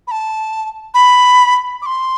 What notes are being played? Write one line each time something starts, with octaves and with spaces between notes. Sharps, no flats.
B5
A5
B5
D6
C6